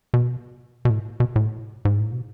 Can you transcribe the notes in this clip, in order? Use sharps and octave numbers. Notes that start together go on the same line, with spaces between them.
B2
B2
A2
B2
A2
G#2
A2
B2